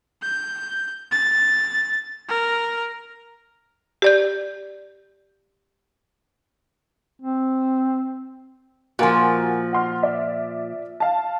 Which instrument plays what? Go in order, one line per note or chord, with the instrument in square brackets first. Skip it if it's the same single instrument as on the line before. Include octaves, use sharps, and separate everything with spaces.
[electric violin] G6
A6
A#4
[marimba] G4 D5 G6
[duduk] C4
[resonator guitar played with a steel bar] A#2 F3 [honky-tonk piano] F#4 A#4 G#5
[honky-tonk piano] F#5 C6 F6
D5 E5
F5 A5